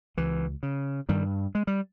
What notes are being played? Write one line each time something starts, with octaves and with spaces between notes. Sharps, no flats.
C#2 E3
C#3
G2 D#3 G3
G#3
G3